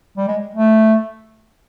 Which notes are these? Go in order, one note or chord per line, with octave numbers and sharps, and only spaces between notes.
G3
G#3
A3